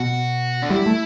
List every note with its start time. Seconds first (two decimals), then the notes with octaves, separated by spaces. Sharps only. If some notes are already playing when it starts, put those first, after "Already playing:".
Already playing: B2 F#4
0.62 D4
0.70 G3 E4
0.86 A3